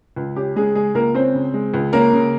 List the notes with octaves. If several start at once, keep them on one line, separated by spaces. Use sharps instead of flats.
C#2
C#4 G4
C#3 G#3 G#4
G#3 G#4
C#2 A#3 A#4
C4 C#4 C5
C#3
G#3
C#2
A#3 C#4 A#4
C#3